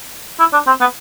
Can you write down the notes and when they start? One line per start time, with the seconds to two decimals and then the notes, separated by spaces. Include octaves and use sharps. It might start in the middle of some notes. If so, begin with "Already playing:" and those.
0.39 E4
0.53 D4
0.67 C4
0.80 B3